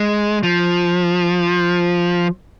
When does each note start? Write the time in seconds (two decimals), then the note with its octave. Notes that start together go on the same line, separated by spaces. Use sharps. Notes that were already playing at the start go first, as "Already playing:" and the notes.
Already playing: G#3
0.43 F3